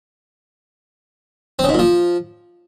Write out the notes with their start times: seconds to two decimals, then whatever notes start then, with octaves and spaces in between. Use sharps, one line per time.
1.59 C4
1.64 C#3
1.69 G#2
1.74 A#2
1.79 F3